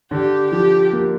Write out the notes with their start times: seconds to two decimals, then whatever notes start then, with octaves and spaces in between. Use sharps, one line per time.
0.11 D3 G4
0.51 F3 G4
0.93 A#3